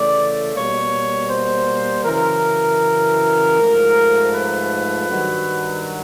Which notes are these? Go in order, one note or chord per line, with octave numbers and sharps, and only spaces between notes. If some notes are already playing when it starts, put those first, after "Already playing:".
Already playing: C#3 E3 A3 D5
B2 G3 A#3 C#5
C5
F#2 C#3 E3 A#4
G#2 F3 A3
B4
G2 D#3 F#3